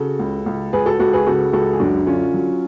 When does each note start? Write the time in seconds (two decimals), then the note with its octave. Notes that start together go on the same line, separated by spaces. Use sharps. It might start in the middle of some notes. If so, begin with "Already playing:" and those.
Already playing: C#3 F#4 A4
0.19 C#2
0.46 C#2
0.73 C#2 G#4 B4
0.86 F#4 A4
1.00 C#2 F#4 A4
1.13 G#4 B4
1.26 C#3 F#4 A4
1.53 C#2 F#4 A4
1.73 G#4
1.80 F#2 D4 F#4
2.06 D3 C#4 F4
2.34 F#3